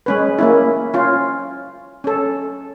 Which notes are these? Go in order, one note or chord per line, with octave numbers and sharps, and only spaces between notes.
G#3 C#4 B4
A#3 C#4 E4
C#4 F4
C#4 A4